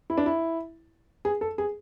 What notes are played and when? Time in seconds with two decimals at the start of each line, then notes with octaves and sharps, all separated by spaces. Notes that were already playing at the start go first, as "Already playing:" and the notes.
0.10 E4
0.18 D4
0.26 E4
1.25 G#4
1.41 A4
1.58 G#4